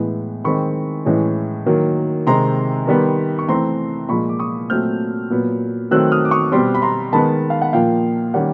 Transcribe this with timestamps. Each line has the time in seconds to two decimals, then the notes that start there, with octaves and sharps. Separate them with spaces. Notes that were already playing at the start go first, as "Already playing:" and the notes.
Already playing: A2 E3 G#3 B3
0.44 D#3 G#3 C4 B5 C#6
1.06 A2 E3 G#3 C#4
1.66 D#3 F#3 A#3
2.27 C3 D#3 G#3 C4 A#5 C6
2.87 D#3 G3 B3
3.39 C#6
3.48 E3 A3 C4 A#5 C6
4.09 A#2 F3 G#3 B5 C#6
4.29 D6
4.39 C#6 D#6
4.70 A#2 F#3 A3 C4 F6 G6
5.30 A#2 F#3 B3
5.91 D#3 F#3 A3 C4 E6 F#6
6.12 D#6 F6
6.25 D6
6.31 C#6 D#6
6.52 B2 G3 C4 C6 D6
6.75 B5
6.82 A#5 C6
7.13 D#3 G#3 B3 A5 B5
7.50 F5
7.62 F#5
7.73 A#2 F3 A#3 F5 G5
8.34 D#3 G3 A#3 C#4 F#5